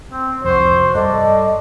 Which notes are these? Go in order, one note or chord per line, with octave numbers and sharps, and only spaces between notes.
C4
C2 F2 F#4 C5
G2 A4 D5 D#5